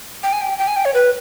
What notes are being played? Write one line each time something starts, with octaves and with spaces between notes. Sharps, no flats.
G5
G#5
G5
G5
G#5
G5
C#5
B4